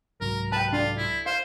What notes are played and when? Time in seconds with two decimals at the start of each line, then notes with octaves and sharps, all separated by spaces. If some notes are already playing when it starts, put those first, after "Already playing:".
0.21 C2 G#2 F#3 A#4
0.52 B4 G5 A5
0.73 D4 F4
0.97 E4
1.26 C5 F5